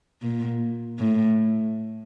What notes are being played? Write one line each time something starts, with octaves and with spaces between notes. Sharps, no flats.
A#2
A2